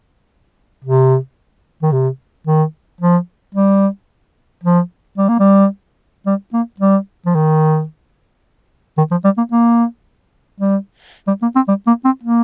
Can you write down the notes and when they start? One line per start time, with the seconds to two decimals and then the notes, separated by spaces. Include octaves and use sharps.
0.84 C3
1.83 D#3
1.92 C3
2.47 D#3
3.01 F3
3.55 G3
4.64 F3
5.18 G3
5.29 A#3
5.40 G3
6.26 G3
6.53 A#3
6.80 G3
7.26 F3
7.35 D#3
8.98 D#3
9.11 F3
9.24 G3
9.38 A#3
9.52 A#3
10.60 G3
11.27 G3
11.42 A#3
11.56 C4
11.68 G3
11.87 A#3
12.05 C4
12.23 A#3